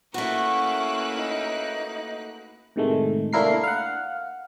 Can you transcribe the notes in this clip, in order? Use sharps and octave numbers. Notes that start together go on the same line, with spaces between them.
A3 A#3 C#4 E4 F#4 B4 C#6 F#6
D#4
A2 C3 D#3 G#3 A3
A3 A#3 D4 E4 A#4 C7
F5 F#5